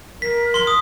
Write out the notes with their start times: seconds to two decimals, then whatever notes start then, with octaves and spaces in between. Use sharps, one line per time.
0.22 A#4 B6
0.54 C6 G7
0.67 D#6